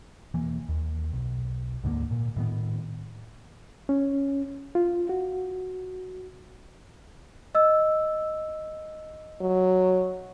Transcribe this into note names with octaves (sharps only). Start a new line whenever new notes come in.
E1 E3 A#3
D#2
B1
D2 G#2 D3 A#3
A#2
A2 D#3 B3
C#4
F4
F#4
D#5 E6
F#3